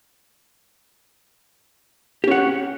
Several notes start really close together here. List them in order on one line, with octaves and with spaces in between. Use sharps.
G4 C#4 F#5